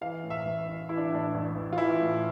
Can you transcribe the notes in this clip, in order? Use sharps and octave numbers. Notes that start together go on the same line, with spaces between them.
E3 F5
A2
E5
A1
A1
E3 E4
D4
A2 D4
A1
A1
F4
E3 E4
A2